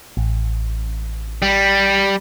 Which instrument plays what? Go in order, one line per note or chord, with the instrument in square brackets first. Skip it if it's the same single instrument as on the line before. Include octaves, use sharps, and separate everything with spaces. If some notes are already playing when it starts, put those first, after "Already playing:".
[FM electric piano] A1
[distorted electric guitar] G3